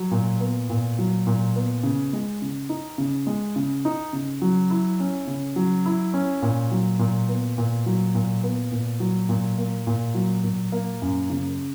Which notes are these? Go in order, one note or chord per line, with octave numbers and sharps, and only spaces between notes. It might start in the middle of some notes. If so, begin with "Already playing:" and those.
Already playing: F#3
A#2
B3
A#2
F#3
A#2
B3
C#3
G#3
C#3
D#4
C#3
G#3
C#3
D#4
C#3
F#3
E4
C#4
C#3
F#3
E4
C#4
A#2
F#3
A#2
B3
A#2
F#3
A#2
B3
A#2
F#3
A#2
A#3
A#2
F#3
A#2
A#3
F#2
C#3